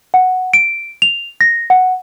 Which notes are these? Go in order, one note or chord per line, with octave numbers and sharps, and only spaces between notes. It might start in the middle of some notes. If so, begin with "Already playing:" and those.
F#5
D7
F7
A#6
F#5